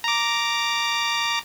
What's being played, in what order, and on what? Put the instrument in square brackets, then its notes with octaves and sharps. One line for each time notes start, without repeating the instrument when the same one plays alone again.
[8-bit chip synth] A#5 D6